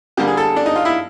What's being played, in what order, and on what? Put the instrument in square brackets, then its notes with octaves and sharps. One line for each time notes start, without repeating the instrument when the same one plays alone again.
[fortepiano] D3 G3 A#3 G4
G#4
A4
D4
D#4
F4
E4